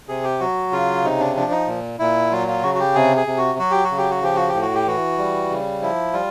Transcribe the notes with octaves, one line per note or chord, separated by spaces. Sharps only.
C3 G#4
G4
F#3 F#4
C#3 F4
C3 D#4
D4
F3 D4
D#4
A#2
A#2 E4
F#3 F4
F4
C#3 F#4
F#4
G4
C3 G#4
G#4
C3
F#4
F#3 F#4
G4
F#4
C#3
G4
F#4
F3 G4
F#4
G4
A2
F#4
G4
E3 F#4
G3
C#3
F3 E4
G3 F4